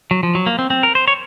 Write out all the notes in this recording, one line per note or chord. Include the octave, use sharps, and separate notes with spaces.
F#3
F3
F#3
A#3
C4
C4
A#4
C5
C#5